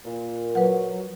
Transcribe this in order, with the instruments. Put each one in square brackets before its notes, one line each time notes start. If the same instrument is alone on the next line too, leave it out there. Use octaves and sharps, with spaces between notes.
[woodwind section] A#2
[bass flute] F#3 [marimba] B4 F#5